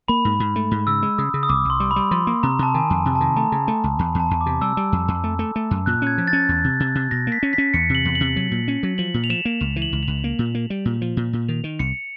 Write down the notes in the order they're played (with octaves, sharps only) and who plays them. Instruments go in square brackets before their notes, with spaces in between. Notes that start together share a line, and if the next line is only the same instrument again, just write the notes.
[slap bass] A#3 [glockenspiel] B5
[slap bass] G#2
G#2
A3
G#2
[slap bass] C#3 [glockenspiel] E6
[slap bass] G#3
[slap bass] C#3 [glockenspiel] D#6
[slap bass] C#3
[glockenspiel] D#6
[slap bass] C2 [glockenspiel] D6
[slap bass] C2 [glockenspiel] C6
[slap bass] G3
[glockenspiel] B5
[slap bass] G3
[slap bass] F3 [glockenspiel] C6
[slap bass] A#3
[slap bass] C3 [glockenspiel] A#5
[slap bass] C3 [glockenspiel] A5
[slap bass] D#3 [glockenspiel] G#5
[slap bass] F2 [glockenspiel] G#5
[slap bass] C3
[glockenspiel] A5
[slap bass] D#3
[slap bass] A3 [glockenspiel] A#5
[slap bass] C#3
A3
C#2
[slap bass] E2 [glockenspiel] B5
[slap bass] E2
[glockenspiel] A5
[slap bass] E2
[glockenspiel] D6
[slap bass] C3
[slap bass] G3 [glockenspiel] E6
[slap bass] G3
F2
F2
A3
A3
A3
F#2
[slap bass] A#2 [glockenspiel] F#6
[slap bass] C#4 [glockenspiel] G#6
[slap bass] F3
[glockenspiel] A6
[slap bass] C#4
E2
C3
C3
C3
[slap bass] B2 [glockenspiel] A#6
[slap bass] A#3
[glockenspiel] B6
[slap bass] C#4
[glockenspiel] B6
[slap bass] C#4
[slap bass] E2 [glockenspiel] C#7
[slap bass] C3
[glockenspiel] F#7
[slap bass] E2
[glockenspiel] F#7
[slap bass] C3
F#3
A#2
C#4
F#3
[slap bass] F3 [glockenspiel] F#7
[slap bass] A#2
[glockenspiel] F7
[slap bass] F3 [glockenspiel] E7
[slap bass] A#3
[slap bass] C#2 [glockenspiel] F7
[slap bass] E3
[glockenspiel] F#7
[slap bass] C#2
[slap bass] C#2 [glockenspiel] F7
[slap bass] A#3
A#2
A#3
G3
A#2
F3
A#2
A#2
[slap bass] D#3 [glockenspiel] F7
[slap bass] D#3
[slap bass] C2 [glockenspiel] C#7